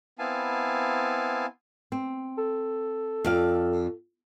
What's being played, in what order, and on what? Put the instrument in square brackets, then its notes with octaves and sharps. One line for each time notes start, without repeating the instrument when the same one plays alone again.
[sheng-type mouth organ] B3 C4 E4 F5 G#5 A5
[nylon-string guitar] C4
[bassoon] A4
[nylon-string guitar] F2 D5 F5